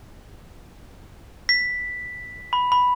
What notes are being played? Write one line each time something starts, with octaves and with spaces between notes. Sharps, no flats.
B6
B5
B5